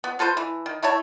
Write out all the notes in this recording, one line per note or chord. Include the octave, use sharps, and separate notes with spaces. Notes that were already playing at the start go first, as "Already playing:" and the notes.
B3
F4 A4 B4 C5
E3
D#3
A3 E4 C#5 A5